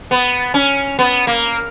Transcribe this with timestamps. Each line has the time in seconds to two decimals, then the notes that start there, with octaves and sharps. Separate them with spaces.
0.11 B3
0.54 C#4
0.99 B3
1.27 A#3